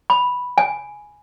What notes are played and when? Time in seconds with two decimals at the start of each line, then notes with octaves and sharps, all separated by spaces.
0.10 B5
0.58 G#5